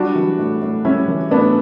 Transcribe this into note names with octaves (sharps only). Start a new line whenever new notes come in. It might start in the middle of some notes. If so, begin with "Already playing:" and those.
Already playing: G3 D4 F#4
E3
A2
A2
G3 C#4 E4
E3
A2 B3 D4